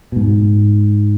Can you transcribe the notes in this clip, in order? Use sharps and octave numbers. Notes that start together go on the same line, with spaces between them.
B2
G#2